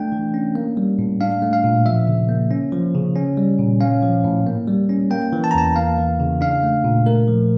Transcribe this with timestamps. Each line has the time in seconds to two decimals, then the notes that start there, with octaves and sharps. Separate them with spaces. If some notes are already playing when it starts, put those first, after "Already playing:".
Already playing: A3 D4 G5
0.12 E3
0.34 C#4
0.55 A#3
0.77 G3
0.99 A2
1.21 D4 F5
1.42 A3
1.53 F5
1.64 A#2
1.86 F3 E5
2.07 C#3
2.29 A#3
2.51 C#4
2.72 F3
2.94 C#3
3.15 C#4
3.37 G3
3.59 A#2
3.81 C#4 F5
4.03 F3
4.24 A2
4.46 A#3
4.67 G3
4.89 C#4
5.11 A#3 G5
5.33 E3
5.44 A5
5.51 A#5
5.55 E2 A5
5.76 A#3 F5
5.98 E3
6.20 C#3
6.41 D4 F5
6.63 A3
6.84 A#2
7.06 A3 A#4
7.28 F3